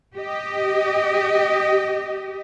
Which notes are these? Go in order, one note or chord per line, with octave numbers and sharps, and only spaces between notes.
G4 D#5